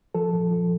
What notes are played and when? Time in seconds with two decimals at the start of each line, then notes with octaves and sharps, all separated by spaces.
0.15 F3 A4
0.32 A#2
0.51 F3